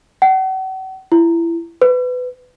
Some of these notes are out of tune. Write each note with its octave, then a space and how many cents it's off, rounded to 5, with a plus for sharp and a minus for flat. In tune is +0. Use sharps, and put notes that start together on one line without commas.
F#5 +40
E4 +25
B4 +20